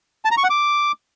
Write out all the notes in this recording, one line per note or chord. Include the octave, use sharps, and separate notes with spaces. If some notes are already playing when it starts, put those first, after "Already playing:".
A5
A#5
C#6
F#5
D6